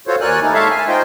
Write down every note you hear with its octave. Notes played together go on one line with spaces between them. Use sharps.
F4 F#4 A4 C5 C#5
D#2 A#4 C#5 D5 G#5 F#6
A3 D#4 E4
G#3 A4 C#5 E5 F5 A5
G#5
D#4 F4 C5 D#5 G5